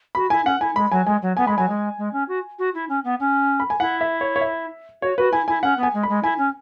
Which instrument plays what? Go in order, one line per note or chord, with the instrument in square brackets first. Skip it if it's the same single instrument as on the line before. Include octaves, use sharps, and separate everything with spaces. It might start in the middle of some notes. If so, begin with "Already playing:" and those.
[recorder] F#4 [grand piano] B5
[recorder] E4 [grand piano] G#5
[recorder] C#4 [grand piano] F#5
[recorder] E4 [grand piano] G#5
[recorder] G#3 [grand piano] B5
[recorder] F#3 [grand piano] G#5
[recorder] G#3 [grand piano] G#5
[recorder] F#3
[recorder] B3 [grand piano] G#5
[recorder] G#3 [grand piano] B5
[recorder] F#3 [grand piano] G#5
[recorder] G#3
G#3
C#4
F#4
F#4
E4
C#4
B3
C#4
[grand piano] B5
G#5
[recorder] E4 [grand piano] F#5
[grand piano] E5
C#5
C#5
E5
[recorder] F#4 [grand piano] C#5
[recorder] F#4 [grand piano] B4
[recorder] E4 [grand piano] G#5
[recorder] E4 [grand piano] G#5
[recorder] C#4 [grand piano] F#5
[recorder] B3
[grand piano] G#5
[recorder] G#3
[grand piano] B5
[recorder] G#3
[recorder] E4 [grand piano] G#5
[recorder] C#4